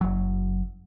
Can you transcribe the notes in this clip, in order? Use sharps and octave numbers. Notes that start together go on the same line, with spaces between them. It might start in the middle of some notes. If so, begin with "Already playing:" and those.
F#1 F#3